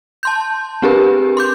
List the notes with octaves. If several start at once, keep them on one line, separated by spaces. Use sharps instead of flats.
A5 C6 G6
C4 D4 G4 G#4 A#4 B4
C6 D6 G6